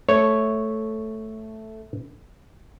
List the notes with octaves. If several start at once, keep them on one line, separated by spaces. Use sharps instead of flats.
A3 C#5